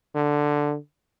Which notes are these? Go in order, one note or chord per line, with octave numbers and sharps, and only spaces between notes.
D3